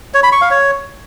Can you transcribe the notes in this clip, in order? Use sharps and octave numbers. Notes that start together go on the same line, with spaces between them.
C#5
B5
C#6
F5
C#5